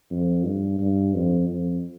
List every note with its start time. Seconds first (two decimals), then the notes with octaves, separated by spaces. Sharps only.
0.11 F2
0.45 G2
0.79 G2
1.14 F2
1.48 F2